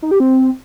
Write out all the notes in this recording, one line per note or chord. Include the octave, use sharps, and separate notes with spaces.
D#4
G4
C4